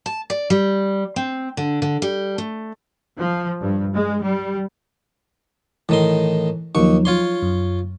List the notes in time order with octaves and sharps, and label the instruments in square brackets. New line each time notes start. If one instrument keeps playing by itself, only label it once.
[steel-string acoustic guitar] A5
D5
G3
C4
D3
D3
G3
A3
[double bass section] F3
G2
G#3
G3
[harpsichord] A2 D#3 C6 [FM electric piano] E3
[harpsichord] D#2 C#6 [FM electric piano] F3 F#3 D#4
[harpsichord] F4 C#5 C6
[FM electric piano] F#2